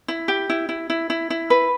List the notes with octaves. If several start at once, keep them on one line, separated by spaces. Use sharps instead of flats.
E4
G4
E4
E4
E4
E4
E4
B4